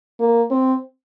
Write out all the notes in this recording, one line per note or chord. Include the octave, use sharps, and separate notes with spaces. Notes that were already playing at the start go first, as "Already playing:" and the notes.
A#3
C4